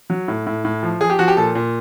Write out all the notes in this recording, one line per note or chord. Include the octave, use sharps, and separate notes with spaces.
F#3
A2
A2
A2
F3
F3 G#4
G4
F3 F#4
G4
A#2 A4
A#2